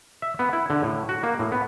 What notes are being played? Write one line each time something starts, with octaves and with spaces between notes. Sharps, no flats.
E5
B3
E4
D3
A2
F#4
A#3
A2
B3